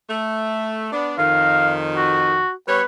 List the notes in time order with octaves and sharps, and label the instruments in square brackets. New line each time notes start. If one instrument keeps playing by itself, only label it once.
[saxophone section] A3
B3 D4
[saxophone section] F2 D#3 [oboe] F5
[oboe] F#4
[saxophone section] G3 B3 C#5 [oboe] B4